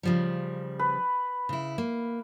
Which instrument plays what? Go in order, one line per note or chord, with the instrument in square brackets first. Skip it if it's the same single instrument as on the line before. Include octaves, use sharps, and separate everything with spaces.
[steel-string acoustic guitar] C#3 F3 G3
[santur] B4
[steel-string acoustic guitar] C#3 E4
A#3